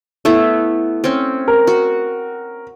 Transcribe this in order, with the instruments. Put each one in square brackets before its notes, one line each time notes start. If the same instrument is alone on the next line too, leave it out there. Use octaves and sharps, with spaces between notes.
[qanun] A3 B3 E4
C4 C#4
[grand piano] A#4
[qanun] F#4